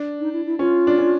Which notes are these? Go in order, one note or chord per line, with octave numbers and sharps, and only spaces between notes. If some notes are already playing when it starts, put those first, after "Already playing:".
Already playing: D4
D#4
E4
E4
C#4 F4
D4
C#4